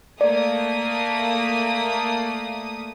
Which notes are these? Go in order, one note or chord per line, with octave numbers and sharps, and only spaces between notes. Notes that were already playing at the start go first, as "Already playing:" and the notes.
A3 A#3 D5 D#6